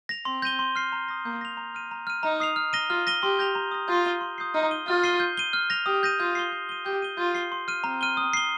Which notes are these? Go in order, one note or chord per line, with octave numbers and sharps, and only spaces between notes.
A#6 F7
C4 C6
G6 A#6 D#7 G7
C6
F6 C7
A#5
D#6 A#6
A#3 G6
A#6 F7
A#5
F6 D#7
A#5
F6 D#7
D#4 A#5
D#6 C7 F7
F6
A#6 D#7 G7
F4 F6
A#6 D#7 G7
G4 C6
G6 A#6 F7
A#5
D#6 A#6
F4 G6
D#7 G7
C6
D#6 G6 C7
D#4 F6
D#7 G7
F4 F6
C7 D#7 G7
G6
D#7 G7
F6
A#6 F7
G4 D#6
G6 A#6 D#7
F4 G6
C7 G7
G6
D#7 G7
G4 G6
D#7 G7
F4 G6
C7 G7
C6
F6 D#7
C4 A#5
F6 D#7 G7
D#6
C7 G7